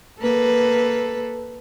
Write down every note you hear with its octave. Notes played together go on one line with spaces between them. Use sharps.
A#3 A4 B4